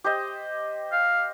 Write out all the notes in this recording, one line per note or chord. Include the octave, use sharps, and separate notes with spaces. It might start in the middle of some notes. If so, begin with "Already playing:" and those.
G4 C5 D#5
F5